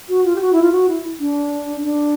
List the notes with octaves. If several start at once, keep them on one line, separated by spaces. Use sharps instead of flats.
F#4
F4
G4
F#4
E4
F4
F#4
E4
D4
D4